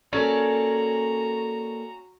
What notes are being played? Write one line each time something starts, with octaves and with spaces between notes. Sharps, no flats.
A#3 C#4 F#4 A4 D5 A#5